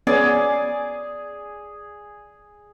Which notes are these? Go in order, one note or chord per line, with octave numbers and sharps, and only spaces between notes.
B3 C#4 G#4 D5